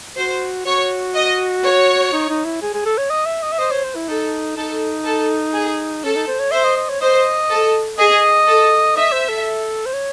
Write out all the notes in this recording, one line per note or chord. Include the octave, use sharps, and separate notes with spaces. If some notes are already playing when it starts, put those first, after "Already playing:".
F#4 C5
F#4 C#5
D#5
C#5
D#4
D#4
E4
G#4
G#4
A4
C#5
D#5
E5
D#5
E5
C5 D#5
C#5
C5
E4
D#4 A4
D#4 A4
A4
G#4
C#4 A4
D#4
C5
C#5
C5 E5
D#5
D#5
C#5
C5 D#5
A4
G#4 D#5
A4
D#5 E5
C5
A4
C5
C#5